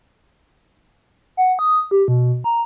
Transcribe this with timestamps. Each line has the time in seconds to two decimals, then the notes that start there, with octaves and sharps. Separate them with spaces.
1.37 F#5
1.59 D#6
1.91 G4
2.08 B2
2.44 A#5